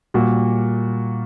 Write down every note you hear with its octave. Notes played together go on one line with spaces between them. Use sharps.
A#2 G3 A#3 F#4